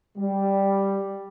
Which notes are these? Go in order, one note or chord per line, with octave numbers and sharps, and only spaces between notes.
G3